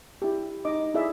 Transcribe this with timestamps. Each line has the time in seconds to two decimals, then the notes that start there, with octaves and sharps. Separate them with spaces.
0.22 E4 G4
0.65 D#4 D#5 D6
0.94 E4 G#4 D5 E5